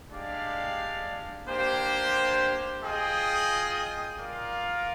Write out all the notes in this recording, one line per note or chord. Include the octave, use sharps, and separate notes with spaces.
G#3 D4 G4 D5 F5
A#3 D4 G4 C5 G5
F4 G#4 D#5 G5
F4 A#4 D5 F5